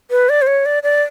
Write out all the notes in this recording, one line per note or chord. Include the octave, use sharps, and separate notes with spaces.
B4
D5
C5
C#5
D5
D5